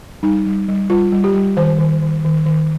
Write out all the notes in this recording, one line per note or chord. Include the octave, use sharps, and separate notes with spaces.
G3 D#4
G3
G3
G3 F4
G3
G4
G3
D#3 C5
D#3
D#3
D#3
D#3